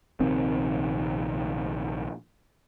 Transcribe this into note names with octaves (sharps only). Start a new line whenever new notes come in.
A#1 C3 D#3 C4